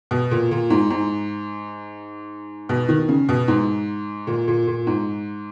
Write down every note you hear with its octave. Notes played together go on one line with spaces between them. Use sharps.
B2
A#2
A#2
G#2
G#2
B2
D#3
C#3
B2
G#2
A#2
A#2
A#2
G#2